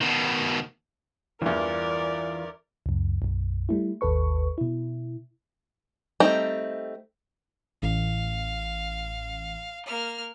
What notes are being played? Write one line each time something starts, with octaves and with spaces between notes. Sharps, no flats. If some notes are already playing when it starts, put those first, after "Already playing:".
B2 D#3
E2 G2 E3 F4 A#4 D5
C#2 F#2
B1 F#2
G3 A3 E4
G#1 D#2 A4 B4 C#6
B2 E4
G3 A3 C4 D#4
A1 F5
A#3 F6